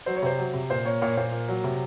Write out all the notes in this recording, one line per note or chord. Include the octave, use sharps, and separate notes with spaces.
F#3 C5
C#5
C3 C5
F#3
C3
A#2 C5
A#3 C#5
A#2 C#5
A#2 C5
A#3
F#3
C3